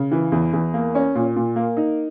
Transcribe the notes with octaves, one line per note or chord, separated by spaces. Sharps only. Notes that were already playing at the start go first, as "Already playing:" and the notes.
Already playing: C#3
E3
E2
E2
A#3
C#4
A#2
A#2
A#3
D#4